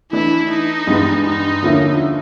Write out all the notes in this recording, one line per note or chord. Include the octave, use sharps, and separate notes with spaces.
E3 A3 D4 E4
D#4
G2 E3 G#3 B3
D#4
D3 F3 A#3 C#4 E4